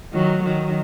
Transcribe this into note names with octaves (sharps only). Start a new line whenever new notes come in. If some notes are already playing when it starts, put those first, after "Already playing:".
D#3 F#3
D#3 F#3